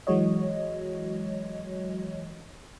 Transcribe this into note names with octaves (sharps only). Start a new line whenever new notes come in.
E3 F#3 G#3 F#4 C#5 D#5